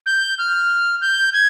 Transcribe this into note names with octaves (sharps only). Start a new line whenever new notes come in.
G6
F6
G6
G#6